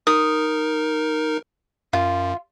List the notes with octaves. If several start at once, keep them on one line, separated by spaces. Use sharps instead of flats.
D#4 A#4 D#6
F#2 F4